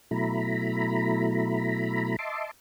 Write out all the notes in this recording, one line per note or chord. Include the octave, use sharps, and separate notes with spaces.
B2 F#3 A3 E4 A#5 B5
D#5 E5 A5 C6 D6